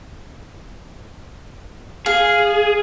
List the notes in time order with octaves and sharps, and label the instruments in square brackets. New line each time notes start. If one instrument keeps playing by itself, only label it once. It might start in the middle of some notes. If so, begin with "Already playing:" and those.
[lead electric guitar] G#4 [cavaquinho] F5